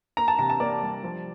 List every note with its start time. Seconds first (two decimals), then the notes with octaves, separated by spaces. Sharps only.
0.17 A#3 A#5
0.28 A5
0.39 C3 A#5
0.50 A5
0.60 A#3 D5
0.82 G3
1.04 F3